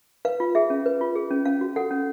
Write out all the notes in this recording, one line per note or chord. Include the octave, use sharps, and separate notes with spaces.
B4 F5
F4
G#4 E5
C#4
B4
F4
G#4
C#4
C#4 F5
F#4
A4 F#5
C#4